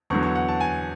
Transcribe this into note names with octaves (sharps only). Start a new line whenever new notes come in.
E2 D3 F#3 C#6
C#6
F#5
A5
G#5